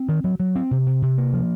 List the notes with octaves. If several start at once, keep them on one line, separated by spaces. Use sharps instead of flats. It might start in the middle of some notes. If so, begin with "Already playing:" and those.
Already playing: C4
D#3
F#3
F#3
C4
C3
C3
C3
A#3
F3